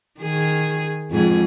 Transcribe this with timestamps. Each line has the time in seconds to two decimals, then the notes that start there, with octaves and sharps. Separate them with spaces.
0.21 D#3 G#4
1.11 F2 G#2 G#4